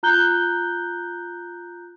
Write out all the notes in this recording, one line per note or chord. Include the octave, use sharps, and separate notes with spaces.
F4 A#5 F#6 G6 G7